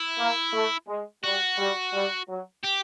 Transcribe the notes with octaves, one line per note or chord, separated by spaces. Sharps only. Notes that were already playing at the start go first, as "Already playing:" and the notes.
Already playing: E4
A#3
A3
G#3
G3 F#4
G3
G3
F#3
G4